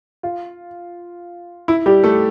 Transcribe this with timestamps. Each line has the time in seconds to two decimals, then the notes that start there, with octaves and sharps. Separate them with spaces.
0.23 F4
1.68 E4
1.86 G3 G4
2.04 A3 A4